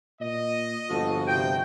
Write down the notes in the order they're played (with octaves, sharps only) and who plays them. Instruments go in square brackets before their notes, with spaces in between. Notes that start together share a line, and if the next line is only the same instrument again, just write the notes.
[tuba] A#2 [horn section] D#5
[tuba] G1 [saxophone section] F3 F#4 [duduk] A4
[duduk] C3 [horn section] G5